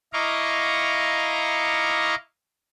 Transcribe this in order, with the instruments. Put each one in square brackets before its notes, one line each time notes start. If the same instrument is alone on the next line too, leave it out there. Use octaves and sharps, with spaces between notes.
[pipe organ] E4 D#5 F5 A#5 C#6 D6